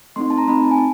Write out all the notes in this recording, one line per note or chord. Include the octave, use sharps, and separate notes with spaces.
A3 C4 D#4 C6
A5
A#5
A3 C4 D#4 B5
A5
G#5
A5